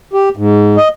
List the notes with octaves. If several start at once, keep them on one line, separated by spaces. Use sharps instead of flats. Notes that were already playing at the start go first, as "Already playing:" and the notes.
G4
G#2
D#5